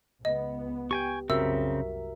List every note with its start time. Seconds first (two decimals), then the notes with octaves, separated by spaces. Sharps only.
0.25 C#2 B3 D#5
0.91 G4 G5 G#5 C#6
1.30 C2 F#2 C#3 C4 F#4 A#4 E5 E6